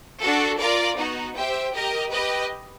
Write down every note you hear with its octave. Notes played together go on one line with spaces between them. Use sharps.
D4 F#4 A4
F4 A#4 D5
B3 D#4 F#4
G4 C5 E5 G5
G4 A#4 D#5
G4 B4 D#5